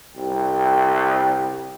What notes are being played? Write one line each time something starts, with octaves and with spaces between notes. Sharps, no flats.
C2 G5